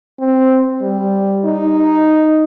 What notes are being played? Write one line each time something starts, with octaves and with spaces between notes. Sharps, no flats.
C4
G3
D#4